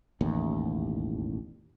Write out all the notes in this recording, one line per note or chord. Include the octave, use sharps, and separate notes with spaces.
E1 A1 D#2